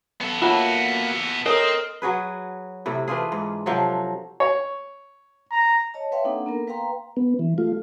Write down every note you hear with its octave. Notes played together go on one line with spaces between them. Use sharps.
B3 A4
A#3 F4 F#4 C#5 E5 A5
C4 A4 A#4 C#5 D#5
F#3 F#4 G#4 B4
A2 C3 E4
E3 D4 F4 G#4
G#2
C3 F3 F#3 A4
C#5
A#5
C#5 D#5 A5
B4 C#5 E5 F5 G5 C6
A#3 C4 D4 D#4 A4 F#5
A#3 B3 A#4
B4 F5 G5 A#5 C6
B3
E3
A3 F4